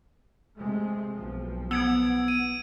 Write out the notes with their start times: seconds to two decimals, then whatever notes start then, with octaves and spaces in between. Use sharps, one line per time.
0.57 C3 G#3 A3
1.16 B1 F3
1.71 B3 E6 G#6 D7
2.28 D#7